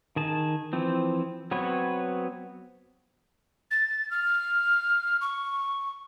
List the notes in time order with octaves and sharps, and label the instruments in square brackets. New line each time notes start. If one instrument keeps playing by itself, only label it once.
[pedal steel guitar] D#3 G#4 A5
E3 F3 C4
F#3 B3 C4 B4 C#5
[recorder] A6
F6
C#6